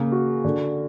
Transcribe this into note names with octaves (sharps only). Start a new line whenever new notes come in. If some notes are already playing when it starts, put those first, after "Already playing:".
Already playing: C#3 A#3
F#4
D3